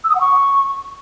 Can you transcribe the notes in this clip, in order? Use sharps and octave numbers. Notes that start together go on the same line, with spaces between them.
E6
D#6
F#5
C#6